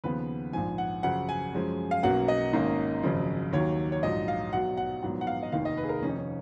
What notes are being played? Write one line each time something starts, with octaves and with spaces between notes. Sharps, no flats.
D#2 C#3 F3 B3 B4
A#1 G#2 F3 G#5
F#5
F#2 C#3 F3 F#5
G#5
F#2 F3 G#3 C#4
F5
B1 B2 F#3 A#3 C#4 F#5
D#5
G#1 G#2 D#3 A#3 C#4
G#1 F#2 C#3 F3
D#2 D#3 F#3 C#5
C#5
A#1 G#2 F#3 D#5
F5
B1 B2 F#3 F#5
F#5
A#1 G#2 D#3 F#3 B3
F#5
F5
D#5
F1 D#2 D#3 F5
D#5
B4
G#4
A#4
F1 F2 D#3 C#4
D#4
C#4